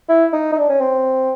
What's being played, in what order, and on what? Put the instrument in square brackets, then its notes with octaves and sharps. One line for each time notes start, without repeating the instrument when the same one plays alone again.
[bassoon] E4
D#4
D#4
D4
C#4
C4